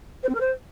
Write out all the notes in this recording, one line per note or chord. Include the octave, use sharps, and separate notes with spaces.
C5
C4
A#4
C5